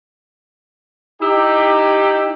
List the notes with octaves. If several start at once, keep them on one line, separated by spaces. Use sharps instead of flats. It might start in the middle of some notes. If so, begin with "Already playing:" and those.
D#4 E4 G4